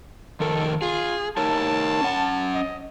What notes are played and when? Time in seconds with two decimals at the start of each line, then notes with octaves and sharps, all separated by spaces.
0.40 F2 D#3 A4 A#4
0.82 F4 G#4
1.37 D#4 A#4 C#5 A5
2.01 C#4 F#5
2.55 D#5